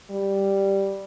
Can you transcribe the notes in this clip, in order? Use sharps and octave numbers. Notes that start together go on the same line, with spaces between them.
G3